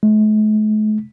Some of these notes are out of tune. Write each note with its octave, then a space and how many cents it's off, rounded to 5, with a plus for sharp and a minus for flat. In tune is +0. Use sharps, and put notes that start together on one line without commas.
A3 -45